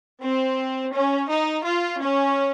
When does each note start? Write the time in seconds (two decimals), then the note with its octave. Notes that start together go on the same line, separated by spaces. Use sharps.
0.21 C4
0.93 C#4
1.29 D#4
1.65 F4
2.00 C#4